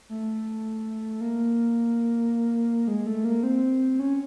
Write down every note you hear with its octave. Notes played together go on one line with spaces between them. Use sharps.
A3
A#3
G#3
A3
A#3
C4
C#4